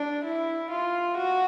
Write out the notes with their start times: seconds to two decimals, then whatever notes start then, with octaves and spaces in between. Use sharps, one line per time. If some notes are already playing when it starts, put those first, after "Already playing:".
Already playing: D4
0.25 E4
0.71 F4
1.17 F#4